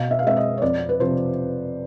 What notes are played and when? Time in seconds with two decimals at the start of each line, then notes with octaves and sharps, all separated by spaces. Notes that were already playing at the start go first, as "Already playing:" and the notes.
Already playing: B2 F5
0.11 E5
0.19 F5
0.24 G#3 C4 E5
0.37 D#5
0.57 C#5
0.62 F2 D5
0.89 B4
1.00 C3 F3 C5